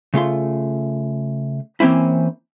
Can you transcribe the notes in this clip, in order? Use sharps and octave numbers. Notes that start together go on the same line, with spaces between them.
C#3 A3 F4 C6
E3 A#3 C4 C#4 E4